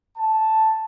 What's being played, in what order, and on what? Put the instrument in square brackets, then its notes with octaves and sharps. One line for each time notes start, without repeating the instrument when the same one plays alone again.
[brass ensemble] A5